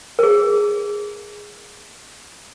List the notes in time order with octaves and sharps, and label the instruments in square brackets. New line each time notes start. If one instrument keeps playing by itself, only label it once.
[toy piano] G#4 A#4